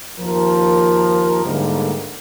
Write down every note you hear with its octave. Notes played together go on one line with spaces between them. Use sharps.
D#2 F3 A#4
G#2 D3 G3 A3 A#3